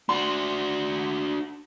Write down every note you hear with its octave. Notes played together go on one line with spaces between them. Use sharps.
D4 F#4 C6